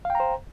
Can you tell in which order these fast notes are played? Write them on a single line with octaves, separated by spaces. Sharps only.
F5 G5 A#5 C5